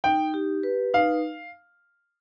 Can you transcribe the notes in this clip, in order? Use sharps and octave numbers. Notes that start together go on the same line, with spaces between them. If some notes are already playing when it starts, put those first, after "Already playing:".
D#4 G5
G4
B4
D#4 F5